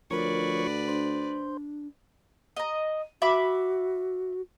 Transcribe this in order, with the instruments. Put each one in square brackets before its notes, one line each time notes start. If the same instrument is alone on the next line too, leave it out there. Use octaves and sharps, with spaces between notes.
[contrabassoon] D2 [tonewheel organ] F3 C#5 C#6 [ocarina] A#4 [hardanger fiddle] B4 D5
[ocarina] D4 [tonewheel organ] C5
[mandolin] D#5 A#5
[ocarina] F#4 [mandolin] E5 B5 D6